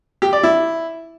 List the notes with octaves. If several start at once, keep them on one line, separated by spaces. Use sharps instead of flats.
G4
D5
E4